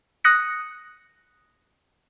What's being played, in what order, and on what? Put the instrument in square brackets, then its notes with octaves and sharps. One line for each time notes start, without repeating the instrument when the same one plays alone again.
[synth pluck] D#6 F#6 A#6 C#7